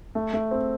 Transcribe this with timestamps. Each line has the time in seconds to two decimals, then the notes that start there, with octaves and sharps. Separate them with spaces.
0.15 A3
0.33 A3
0.51 C4